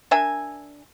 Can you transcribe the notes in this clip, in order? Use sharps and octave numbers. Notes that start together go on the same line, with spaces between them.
D4 A#4 E5 G#5